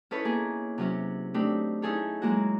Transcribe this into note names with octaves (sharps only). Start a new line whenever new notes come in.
C#4 D#4 E4 A4 B4 C#5
A#3 B3 G#4
C3 F#3 C#4
A3 C4 D4 D#4 G4
C#4 D#4 E4 G#4 A4 C#5
F#3 G#3 A#3 F#4